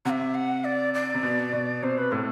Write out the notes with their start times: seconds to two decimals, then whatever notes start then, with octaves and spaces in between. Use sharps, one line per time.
0.05 C3 F#5
0.10 E5
0.34 F#5
0.64 D5
0.94 D5
1.14 C3
1.23 B2
1.53 B2
1.83 C3 C5
1.97 B4
2.12 A2 A4